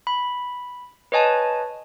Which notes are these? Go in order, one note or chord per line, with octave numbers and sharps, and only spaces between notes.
B5
B4 C#5 D#5 G#5 A5